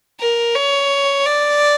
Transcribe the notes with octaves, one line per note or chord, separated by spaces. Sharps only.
A#4
C#5
D5